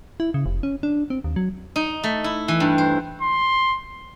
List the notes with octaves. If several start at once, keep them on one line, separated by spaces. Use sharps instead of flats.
E4
C#3
F1
C#4
D4
C4
D#2
F#3
D#4
A3
E4
E3
G2
C5
C6